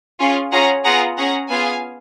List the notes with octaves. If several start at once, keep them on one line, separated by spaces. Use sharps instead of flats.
C#4 F4 G#4 C#5
C#4 F4 G#4 F#5 A#5
B3 F4 G#4 F#5 A#5
C#4 G#4 F#5 A#5
B3 F4 G#4 F5 G#5